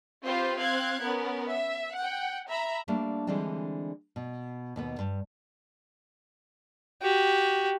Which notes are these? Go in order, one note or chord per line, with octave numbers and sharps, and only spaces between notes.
C4 F4 G4 B4 C5
C4 F5 F#6 G#6
B3 C#4 A#4
E5
F#5 G5
E5 A#5 B5
G3 A3 A#3 D4
D3 E3 G3 G#3 C4 D4
B2
D#2 B2 B3
G2
F#4 G4